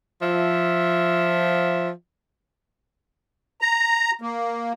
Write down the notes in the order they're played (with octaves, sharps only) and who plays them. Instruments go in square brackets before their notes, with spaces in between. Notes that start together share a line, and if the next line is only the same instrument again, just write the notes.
[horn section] F3 E5
[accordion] A#5
A#3